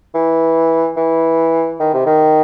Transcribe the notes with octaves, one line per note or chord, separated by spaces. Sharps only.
E3
E3
D#3
C3
D#3